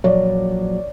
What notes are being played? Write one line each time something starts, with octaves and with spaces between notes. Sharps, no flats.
A#1 F3 F#3 C#5 D5